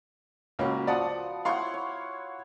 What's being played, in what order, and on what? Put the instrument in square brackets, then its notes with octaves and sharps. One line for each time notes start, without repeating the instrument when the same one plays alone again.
[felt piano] C#2 A#3 C#4 [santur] F#3 B4
[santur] F3 D#6 [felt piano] D5 F#5 A5
[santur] E4 C#5 F#5 [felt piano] F5 C6 C#6
[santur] C#5